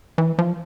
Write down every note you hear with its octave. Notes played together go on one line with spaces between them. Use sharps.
E3
F3